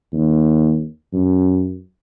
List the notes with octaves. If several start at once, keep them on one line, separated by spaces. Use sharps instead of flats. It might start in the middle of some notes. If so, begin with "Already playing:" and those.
D#2
F#2